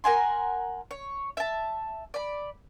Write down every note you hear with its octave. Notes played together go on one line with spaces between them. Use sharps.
A#4 F#5 G#5 C6
C#5
E5 A5
D5 B5